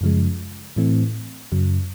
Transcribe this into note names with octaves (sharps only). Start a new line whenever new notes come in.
F#2 C#3 F3 G#3
A2 E3 A3 C4
F#2 C#3 F#3